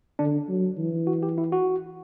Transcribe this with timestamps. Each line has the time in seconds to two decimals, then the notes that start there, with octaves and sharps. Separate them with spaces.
0.19 D3 D4
0.48 F#3
0.77 E3
1.07 F#4
1.23 G4
1.38 E4
1.52 F#4